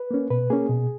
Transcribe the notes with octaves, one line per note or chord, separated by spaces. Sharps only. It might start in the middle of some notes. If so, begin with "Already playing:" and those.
Already playing: B4
A#3 C#4
B2 B4
A#3 C#4 G#4
B2